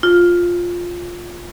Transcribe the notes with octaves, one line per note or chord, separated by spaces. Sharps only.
F4